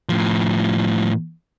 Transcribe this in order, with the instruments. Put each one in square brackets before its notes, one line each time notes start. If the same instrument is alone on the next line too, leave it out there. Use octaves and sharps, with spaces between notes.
[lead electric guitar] A2 F3